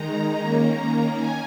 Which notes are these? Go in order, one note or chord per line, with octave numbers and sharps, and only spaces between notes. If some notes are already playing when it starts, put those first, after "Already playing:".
Already playing: D#3 G#3 D#4 A#5
D#3 A#3 C#4
D#3 G#5